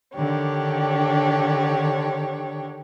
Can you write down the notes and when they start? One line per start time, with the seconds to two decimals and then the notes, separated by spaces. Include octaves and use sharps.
0.14 D3 D#3 D4 G4 C#5